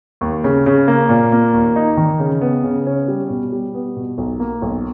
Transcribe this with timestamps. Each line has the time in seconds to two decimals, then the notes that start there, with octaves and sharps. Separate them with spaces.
0.21 D#2
0.44 C#3
0.66 C#3
0.88 A#3
1.09 A#2
1.32 A#3
1.54 D#2
1.76 D#4
1.97 D#3
2.20 C#3
2.41 B3
2.63 C#3
2.86 C#4
3.08 G3
3.30 B2
3.52 G3
3.75 B3
3.96 B2
4.18 B1
4.40 A#3
4.62 B1